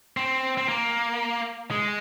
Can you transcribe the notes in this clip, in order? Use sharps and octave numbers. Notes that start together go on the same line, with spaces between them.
C4
C4
A#3
G#3